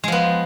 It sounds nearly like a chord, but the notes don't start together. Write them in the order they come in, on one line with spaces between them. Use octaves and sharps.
G#3 F3 B3